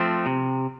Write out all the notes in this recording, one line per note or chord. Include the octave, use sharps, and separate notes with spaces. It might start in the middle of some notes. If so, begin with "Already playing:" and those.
Already playing: F3 A3 C4
C3